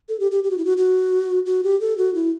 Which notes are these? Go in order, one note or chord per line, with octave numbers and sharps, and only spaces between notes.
A4
G4
G4
G4
F#4
E4
F#4
F#4
F#4
G4
A4
F#4
E4